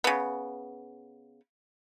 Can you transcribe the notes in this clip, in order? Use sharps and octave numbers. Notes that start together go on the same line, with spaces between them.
C#3 B3